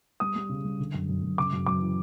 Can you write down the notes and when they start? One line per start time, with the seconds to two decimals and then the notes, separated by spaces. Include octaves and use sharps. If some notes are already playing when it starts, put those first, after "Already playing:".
0.20 G3 D#6
0.36 G3
0.49 C#3
0.65 G3
0.80 D3
0.94 F#2
1.09 F#2
1.23 F#2
1.38 C#3 D6
1.53 F#2
1.66 F#2 D6
1.81 E3